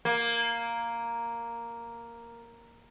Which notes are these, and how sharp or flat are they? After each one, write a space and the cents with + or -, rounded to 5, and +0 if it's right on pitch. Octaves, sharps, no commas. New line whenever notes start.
A#3 +0